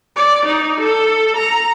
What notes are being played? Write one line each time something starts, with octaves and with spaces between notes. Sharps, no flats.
D5
D#4
A4
A#5